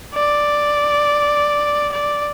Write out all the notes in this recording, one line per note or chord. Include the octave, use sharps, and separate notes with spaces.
D5
D5